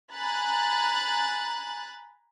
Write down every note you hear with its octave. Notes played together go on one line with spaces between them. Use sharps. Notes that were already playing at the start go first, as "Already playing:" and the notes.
G#5 A#5 B5 F#6 A6